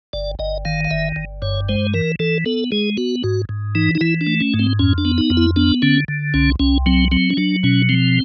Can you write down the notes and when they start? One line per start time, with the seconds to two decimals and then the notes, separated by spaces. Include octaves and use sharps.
0.13 G1 D5
0.39 G1 D#5
0.65 D#3 F5
0.85 F5
0.91 G1 E5
1.16 G1
1.42 G2 C#5
1.69 G#3 C5
1.94 E3 A#4
2.19 E3 A4
2.46 B3 A4
2.72 G#3 G#4
2.97 B3 F#4
3.24 G#2 F#4
3.49 G#2
3.75 E3 D#4
3.95 D#4
4.01 E3 E4
4.21 D4
4.27 A3
4.40 C#4
4.54 G#2
4.59 C4
4.79 F2 C#4
4.98 D4
5.05 B3
5.18 D#4
5.30 F2
5.37 E4
5.56 B3 D4
5.82 D3 C#4
6.08 D3
6.34 C2 C#4
6.60 C2 C#4
6.86 F#3 C4
7.11 F#3 C4
7.30 C#4
7.37 F#3 D4
7.63 B2 C#4
7.89 F3 C4